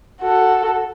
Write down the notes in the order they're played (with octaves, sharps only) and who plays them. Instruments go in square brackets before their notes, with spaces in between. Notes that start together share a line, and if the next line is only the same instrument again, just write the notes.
[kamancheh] F#4 A4